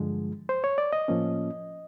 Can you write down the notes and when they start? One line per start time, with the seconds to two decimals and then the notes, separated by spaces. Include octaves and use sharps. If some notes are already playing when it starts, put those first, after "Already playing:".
Already playing: G2 D3 F3 G#3
0.49 C5
0.64 C#5
0.78 D5
0.93 D#5
1.08 A2 F3 A#3 C#4